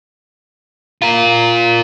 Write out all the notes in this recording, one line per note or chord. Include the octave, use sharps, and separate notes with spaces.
F4 A#4